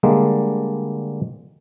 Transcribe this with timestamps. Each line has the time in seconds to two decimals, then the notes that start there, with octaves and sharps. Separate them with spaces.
0.03 D3 G3 G#3 A#3